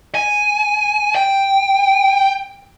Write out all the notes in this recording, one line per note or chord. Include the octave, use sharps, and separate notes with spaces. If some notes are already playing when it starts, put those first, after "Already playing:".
G#5
G5